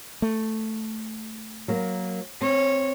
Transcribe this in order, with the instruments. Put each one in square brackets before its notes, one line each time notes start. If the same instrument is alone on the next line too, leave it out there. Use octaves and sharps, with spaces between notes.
[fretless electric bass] A3
[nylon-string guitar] F#3 A#3 A#4
[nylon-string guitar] C4 [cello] C#5